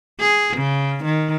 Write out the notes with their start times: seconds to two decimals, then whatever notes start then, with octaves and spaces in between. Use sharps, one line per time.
0.20 G#4
0.58 C#3
1.05 D#3